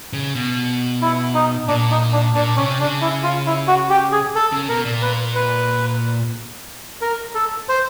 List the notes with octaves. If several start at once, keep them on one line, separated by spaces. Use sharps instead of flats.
C#3
B2
E4
D#4
A#2 D4
D#4
D4
A#2 D4
C3 C#4
C#3 D4
E4
F4
E4
F#4
G4
G#4
A4
C#3
B2 A#4
A#2
B4
B4
A#4
A4
C5